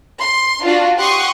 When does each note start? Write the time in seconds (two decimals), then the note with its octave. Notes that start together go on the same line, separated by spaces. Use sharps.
0.21 C6
0.63 D4 F4 F#4
0.97 G4 F#5 C6 C#6 D#6